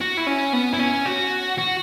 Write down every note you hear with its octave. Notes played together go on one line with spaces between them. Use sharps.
F#4
E4
C#4
B3
E4
C#4
F#4
F#4